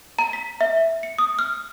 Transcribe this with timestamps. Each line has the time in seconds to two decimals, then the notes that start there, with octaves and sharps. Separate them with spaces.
0.19 A#5
0.33 B6
0.61 E5
1.03 C#7
1.18 D#6
1.39 F6